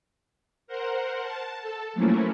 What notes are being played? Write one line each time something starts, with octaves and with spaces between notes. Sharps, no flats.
A#4 C5 F#5
A5
A4
F3 F#3 A3 A#3 C#4 E4